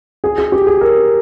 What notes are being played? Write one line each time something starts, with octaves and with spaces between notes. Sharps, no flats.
G#4
G#4
G4
G#4
A#4